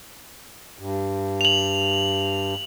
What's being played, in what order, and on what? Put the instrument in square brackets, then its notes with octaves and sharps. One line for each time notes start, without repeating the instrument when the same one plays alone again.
[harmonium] G2
[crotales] F7 F#7